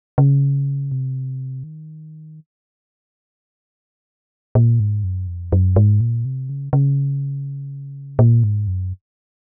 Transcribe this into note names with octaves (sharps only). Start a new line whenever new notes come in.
C#3
C3
D#3
A#2
G#2
F#2
F2
F#2
G#2
A#2
C3
C#3
C#3
A#2
G#2
F#2